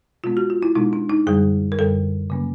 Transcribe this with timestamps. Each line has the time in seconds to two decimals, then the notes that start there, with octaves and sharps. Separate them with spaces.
0.24 B2 G#3 B3 F4
0.37 F#4
0.50 F4
0.63 E4
0.75 B2 G#3 B3 D#4
0.93 D4
1.10 D#4
1.27 F#2 D3 G3 G#4
1.72 A#4
1.79 F#2 D3 G3 A4
2.30 C#3 F#3 A#3 C#4